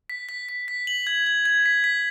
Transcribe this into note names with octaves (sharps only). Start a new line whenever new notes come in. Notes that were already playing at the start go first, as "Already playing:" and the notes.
B6
B6
B6
B6
F#7
G#6
G#6
G#6
B6
B6